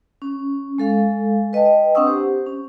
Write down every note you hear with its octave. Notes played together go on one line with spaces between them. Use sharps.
C#4
G#3 A4 F5
B4 D#5 G5 A5
C4 D4 F#5 C#6 D#6 E6
G4 C5
C#4